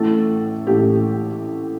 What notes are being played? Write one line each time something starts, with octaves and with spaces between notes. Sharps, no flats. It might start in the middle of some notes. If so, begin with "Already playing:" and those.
Already playing: A1 A2 A3 A4
A1 A2 A3 G4